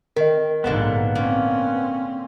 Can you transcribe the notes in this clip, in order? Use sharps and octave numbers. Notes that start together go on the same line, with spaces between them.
D#3 A#4 D#5
A#1 G#2 D3 A#3 B3 A5
A#3 C4 C#4